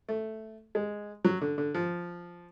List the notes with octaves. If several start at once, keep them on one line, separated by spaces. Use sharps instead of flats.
A3
G#3
F#3
D3
D3
F3